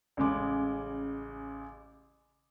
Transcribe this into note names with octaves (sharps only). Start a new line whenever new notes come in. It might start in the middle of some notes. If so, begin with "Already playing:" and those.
A1 C#3 G#3 D6